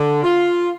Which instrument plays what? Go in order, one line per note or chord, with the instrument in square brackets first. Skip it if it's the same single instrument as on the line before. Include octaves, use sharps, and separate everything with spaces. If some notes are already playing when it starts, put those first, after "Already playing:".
Already playing: [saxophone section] D3
F4